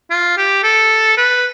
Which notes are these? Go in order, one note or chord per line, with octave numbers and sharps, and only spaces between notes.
F4
G4
A4
B4